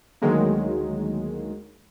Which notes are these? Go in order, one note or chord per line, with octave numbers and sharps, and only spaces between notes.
D2 D#3 F#3 G#3 A#3